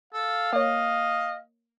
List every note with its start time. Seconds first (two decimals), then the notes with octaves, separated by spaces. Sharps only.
0.13 A4 F5
0.53 A#3 C#5 D#5